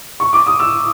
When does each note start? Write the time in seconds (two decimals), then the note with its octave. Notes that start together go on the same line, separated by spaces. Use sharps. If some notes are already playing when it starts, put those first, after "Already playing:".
0.20 C#6
0.33 D6
0.47 D#6
0.60 E6